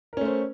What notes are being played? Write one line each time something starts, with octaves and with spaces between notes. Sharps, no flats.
A3 C#4 A#4 C5